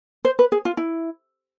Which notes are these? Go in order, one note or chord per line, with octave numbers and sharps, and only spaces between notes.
C5
B4
G#4
F4
E4